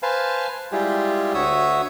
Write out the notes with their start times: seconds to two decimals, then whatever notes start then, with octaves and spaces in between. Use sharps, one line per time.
0.03 B4 C5 F5 G#5 A5
0.72 G3 G#3 E4 F4 G4 G#4
1.34 D2 F#4 C#5 E5 D#6 E6